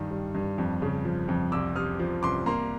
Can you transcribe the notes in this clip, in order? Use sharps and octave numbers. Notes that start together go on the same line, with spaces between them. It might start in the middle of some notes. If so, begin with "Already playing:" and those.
Already playing: G2 D#3
G3
G2
F2
C#3
F3
F2
C2 D6 E6
C3 D#6 F6
F3
C2 C6 D6
A#3 A#5 C6